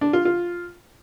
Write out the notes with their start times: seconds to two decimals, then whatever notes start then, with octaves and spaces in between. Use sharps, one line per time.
0.01 D4
0.13 F4
0.25 F4